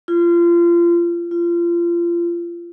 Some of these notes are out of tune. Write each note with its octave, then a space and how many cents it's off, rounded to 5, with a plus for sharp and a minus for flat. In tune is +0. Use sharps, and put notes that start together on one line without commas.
F4 -30
F4 -30